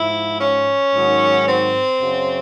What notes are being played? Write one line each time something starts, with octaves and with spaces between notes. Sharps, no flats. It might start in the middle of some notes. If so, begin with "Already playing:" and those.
Already playing: G#2 F3 E4
C#4
G#2 D#3 F#3
C4
F#2 C#3 F#3